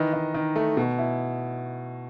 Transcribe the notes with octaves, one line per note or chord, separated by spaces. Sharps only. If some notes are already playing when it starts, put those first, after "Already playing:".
Already playing: D#3 E3 B4 D#5
D#3
D#3
A3
B2
E4